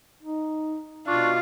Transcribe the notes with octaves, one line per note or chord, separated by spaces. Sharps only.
D#4
B2 D4 F4 C#6